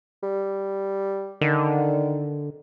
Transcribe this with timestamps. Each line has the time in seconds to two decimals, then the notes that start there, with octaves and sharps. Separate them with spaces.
0.23 G3
1.41 D3 D#3